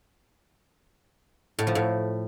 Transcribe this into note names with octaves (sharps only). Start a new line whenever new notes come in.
A2
F3
A2